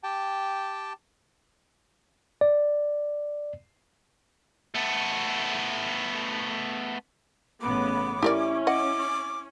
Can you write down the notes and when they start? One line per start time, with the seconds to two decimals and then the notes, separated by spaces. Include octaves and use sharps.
0.03 G4 G5 A5
2.41 D5
4.75 A3 B3
7.61 A1 C#3 B3 D6
8.23 C#4 E4 G4 A#4 D5
8.67 D#5 F#5 D6